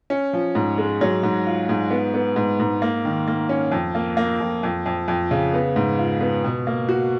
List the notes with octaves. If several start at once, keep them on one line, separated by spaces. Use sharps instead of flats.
C#4
F3
G#2
G#3
F#3
G#2
F4
G#2
B3
B3
G#2
G#2
A#3
D#3
A#3
C#4
F2
A#3
A#3
F2
F2
F2
F2
C#3
B3
G#2
F4
B3
B2
A#3
F#4